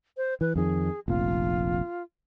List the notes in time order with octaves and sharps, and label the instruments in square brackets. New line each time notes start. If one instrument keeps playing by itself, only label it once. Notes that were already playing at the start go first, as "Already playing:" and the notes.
[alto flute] C5
[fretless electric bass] E3 [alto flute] B4
[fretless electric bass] F2 D#3 F3 [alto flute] G#4
[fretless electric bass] F1 A#1 [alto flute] F4